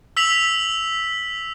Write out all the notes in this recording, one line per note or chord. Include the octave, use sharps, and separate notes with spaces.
E6 B6 F7 F#7